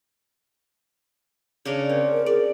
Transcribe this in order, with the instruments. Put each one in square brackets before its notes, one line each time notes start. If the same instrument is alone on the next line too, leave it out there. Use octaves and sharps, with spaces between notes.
[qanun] C#3 D4 A#4
[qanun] C4 [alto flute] A#4
[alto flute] G#4 [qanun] D5